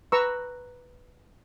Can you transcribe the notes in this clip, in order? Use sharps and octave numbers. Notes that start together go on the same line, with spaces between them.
B4 A#5 C#6 E6